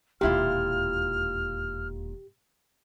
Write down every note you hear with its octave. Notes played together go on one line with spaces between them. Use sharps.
E1 D#2 A#2 E4 F4 G4 F6